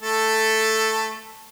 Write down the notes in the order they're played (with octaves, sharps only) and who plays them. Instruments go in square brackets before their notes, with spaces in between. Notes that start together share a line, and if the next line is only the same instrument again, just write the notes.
[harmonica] A3 A4